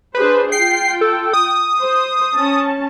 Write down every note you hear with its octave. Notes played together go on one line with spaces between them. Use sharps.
D4 G#4 B4 C5
F4 G5 C7
A4
D#6
C5
C#4 A5